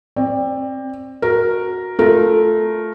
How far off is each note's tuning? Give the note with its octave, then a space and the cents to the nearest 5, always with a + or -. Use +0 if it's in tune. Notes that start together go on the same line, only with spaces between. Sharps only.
C4 +20 D5 +0
F#4 -10 A#4 +0
A3 -10 F4 +0 A#4 +0